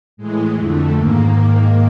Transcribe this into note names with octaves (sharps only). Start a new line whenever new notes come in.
A2 E3 G#3
F2 D3 A3
G#2 D#3 A#3